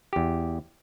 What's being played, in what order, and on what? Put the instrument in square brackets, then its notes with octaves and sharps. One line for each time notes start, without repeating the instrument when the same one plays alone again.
[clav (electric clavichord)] E2 G4